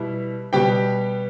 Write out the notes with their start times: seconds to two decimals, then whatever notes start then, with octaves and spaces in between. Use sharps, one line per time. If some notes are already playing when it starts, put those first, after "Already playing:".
Already playing: B2 G3 E4
0.53 B2 G3 B3 G4 G5